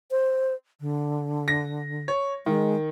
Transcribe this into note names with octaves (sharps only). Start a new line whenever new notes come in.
C5
D3
A#6
C#5
D#3 G#3